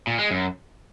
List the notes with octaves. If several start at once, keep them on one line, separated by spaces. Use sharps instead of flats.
A#2
G#3
F#2